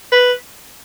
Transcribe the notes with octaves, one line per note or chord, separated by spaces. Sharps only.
B4